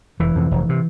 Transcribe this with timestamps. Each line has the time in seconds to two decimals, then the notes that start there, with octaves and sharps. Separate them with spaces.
0.20 F1 E3
0.35 F2 C3
0.51 F1
0.69 C3